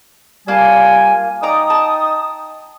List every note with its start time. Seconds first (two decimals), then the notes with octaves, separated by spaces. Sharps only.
0.48 G3 A#3 F4 G#5 A5
1.43 D#4 D5 G5 A#5 D6 D#6
1.70 A5